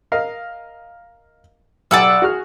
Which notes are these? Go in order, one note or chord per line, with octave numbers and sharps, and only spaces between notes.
A#4 D#5 F5
B1 G4 D5 F#5 G#5 E6
F#4 G#4 F6